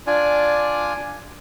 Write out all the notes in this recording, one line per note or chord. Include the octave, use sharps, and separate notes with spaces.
D4 F4 D5 G#5